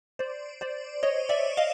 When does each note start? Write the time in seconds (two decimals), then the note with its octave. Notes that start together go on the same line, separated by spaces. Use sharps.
0.19 C5 D5
0.61 C5 D5
1.03 C#5 D#5
1.29 D5 E5
1.57 D#5 F5